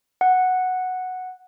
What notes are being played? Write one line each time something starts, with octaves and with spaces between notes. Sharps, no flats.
F#5